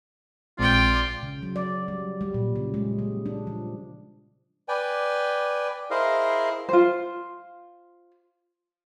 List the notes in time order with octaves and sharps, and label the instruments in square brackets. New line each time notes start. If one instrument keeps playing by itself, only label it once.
[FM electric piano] A#1 G#3 C4 [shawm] F4 [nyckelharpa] D5 G5
[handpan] C#3
F#3
D5
G3
G3
A#2
C#3
G#3
G3
D4
F3
[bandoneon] B4 D5 G5 G#5
E4 G#4 A#4 C5 D#5 F5
[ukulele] F4 C5